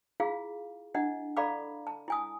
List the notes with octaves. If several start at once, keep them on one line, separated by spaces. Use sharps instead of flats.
E4 F4 G#4 F5
D4 E4 D#5 F#5
A4 D5 F5 A#5 B5 D6
A5
E4 G#5 D#6